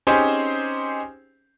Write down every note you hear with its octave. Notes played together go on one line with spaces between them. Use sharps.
C4 C#4 D#4 G4 G#4 C5